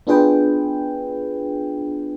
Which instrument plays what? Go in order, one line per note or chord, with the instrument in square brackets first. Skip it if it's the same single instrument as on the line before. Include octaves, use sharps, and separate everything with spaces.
[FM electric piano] B3 D4 F4 G#4 B4 G5